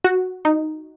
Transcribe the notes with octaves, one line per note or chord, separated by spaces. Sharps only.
F#4
D#4